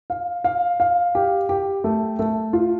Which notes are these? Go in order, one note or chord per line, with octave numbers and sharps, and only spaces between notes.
F5
F5
F5
G4
G4
A3
A3
F4